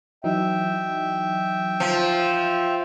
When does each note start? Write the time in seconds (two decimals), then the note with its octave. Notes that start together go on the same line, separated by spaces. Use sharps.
0.24 E3 F#3 D#4 E5 G5
1.80 F3